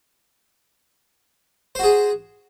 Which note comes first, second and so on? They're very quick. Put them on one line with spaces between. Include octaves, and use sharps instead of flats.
C5 F#4 G#4